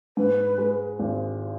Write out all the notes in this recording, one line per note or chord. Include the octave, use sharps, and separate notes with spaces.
G#2 B4
G#3
G#1